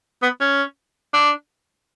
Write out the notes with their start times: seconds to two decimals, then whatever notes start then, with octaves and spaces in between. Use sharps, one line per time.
0.22 B3
0.41 C#4
1.13 D4